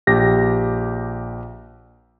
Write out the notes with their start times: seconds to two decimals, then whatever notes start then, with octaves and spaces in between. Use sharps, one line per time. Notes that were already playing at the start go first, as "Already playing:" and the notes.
0.07 A#1 G4 A#6